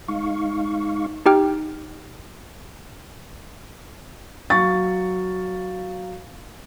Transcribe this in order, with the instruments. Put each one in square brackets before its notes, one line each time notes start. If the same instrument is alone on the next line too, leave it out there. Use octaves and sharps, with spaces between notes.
[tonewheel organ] G#3 D#4 F5 C#6
[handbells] D#4 G4 G5 F6
[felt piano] F#3 F5 C#6 A6